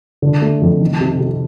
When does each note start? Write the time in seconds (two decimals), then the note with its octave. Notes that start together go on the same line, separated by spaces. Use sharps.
0.22 D3
0.42 A3
0.62 F2
0.81 D#3
1.01 C3
1.21 C3